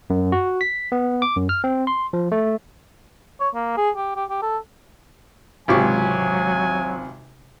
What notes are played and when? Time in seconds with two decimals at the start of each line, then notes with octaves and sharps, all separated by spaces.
0.10 F#2
0.32 F#4
0.61 B6
0.92 B3
1.22 D6
1.36 F#2
1.49 F6
1.64 C4
1.87 C6
2.13 F3
2.32 A3
3.40 C#5
3.55 A#3
3.77 G#4
3.97 G4
4.16 G4
4.30 G4
4.42 A4
5.68 G#1 C#2 C3 F#3 F4 G4 G#5 C#6